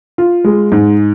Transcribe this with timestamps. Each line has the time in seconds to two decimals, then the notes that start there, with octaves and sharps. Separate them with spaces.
0.18 F4
0.44 G#3
0.72 G#2